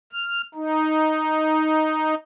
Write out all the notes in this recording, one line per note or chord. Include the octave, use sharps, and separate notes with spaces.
F6
D#4